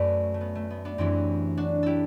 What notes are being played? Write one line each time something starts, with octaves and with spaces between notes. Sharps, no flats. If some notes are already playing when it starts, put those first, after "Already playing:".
Already playing: F#2 F#3 A3 A4 B4 D5
A3
B3
A3
B3
B3 D4
F#2 E3 G3 C4 E4
D4 F#4
E4 G4 A4